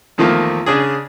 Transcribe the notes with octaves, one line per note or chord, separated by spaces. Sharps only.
E2 D#3 F3 A3 A#3
C#3 D4 G#4